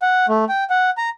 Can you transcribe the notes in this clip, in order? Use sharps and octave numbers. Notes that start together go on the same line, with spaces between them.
F#5
A3
G5
F#5
A#5